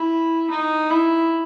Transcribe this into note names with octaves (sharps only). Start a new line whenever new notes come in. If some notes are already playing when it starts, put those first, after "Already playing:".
Already playing: E4
D#4
E4